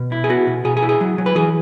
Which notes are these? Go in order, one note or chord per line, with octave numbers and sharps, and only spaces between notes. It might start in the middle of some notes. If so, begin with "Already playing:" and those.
Already playing: B2
E4
G#4
B3 F#4
B2
B2 G#4
G#4
E4
G#4
F#3
F#3
B4
E3 G#4